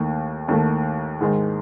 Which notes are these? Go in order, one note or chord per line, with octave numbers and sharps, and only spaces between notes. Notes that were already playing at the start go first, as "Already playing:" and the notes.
Already playing: D#2 D#3 A3
D#2 D#3 A3
G#2 D#3 G#3